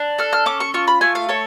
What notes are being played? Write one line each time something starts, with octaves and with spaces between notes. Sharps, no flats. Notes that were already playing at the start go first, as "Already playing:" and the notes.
Already playing: D4
A4 F6
F6
C#4 D6
C#6
F4 C#6
B5
A3 G#5
F5
A4 C#5